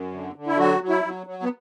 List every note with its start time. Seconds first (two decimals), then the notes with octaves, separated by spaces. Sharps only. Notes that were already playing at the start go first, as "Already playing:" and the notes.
Already playing: F#2
0.13 D3
0.36 D3
0.47 E4
0.58 F#3 F#4
0.81 F#3
0.89 E4
1.04 F#3
1.27 F#3
1.43 B3